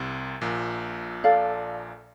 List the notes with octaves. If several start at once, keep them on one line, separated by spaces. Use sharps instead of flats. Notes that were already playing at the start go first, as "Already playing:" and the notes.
Already playing: C2 C3
A#1 A#2
A4 D5 F5